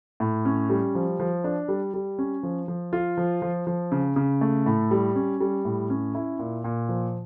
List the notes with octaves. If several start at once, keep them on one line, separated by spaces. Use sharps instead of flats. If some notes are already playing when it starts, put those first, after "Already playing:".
A2
C#4
G3
F3
F3
D4
G3
G3
C#4
F3
F3
F4
F3
F3
F3
C#3
C#3
A3
A2
G3
C#4
G3
A2
C#4
E4
A#2
A#2
F3